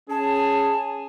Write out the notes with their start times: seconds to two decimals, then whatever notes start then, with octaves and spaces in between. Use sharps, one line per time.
0.10 C#4 G#4 A5